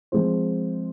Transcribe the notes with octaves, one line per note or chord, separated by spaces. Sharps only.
F3 G#3 C4 F4 C5